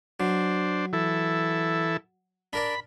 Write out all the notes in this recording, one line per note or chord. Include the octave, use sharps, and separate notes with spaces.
F#3 D4 C5
E3 E4 A4
D4 A#4 D5 B5